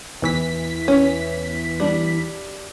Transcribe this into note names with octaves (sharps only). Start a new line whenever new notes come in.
E2 E3 B6
C#4
G3 D4